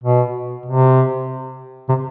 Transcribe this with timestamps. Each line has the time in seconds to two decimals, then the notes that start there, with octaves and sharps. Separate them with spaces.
0.04 B2
0.66 C3
1.89 C3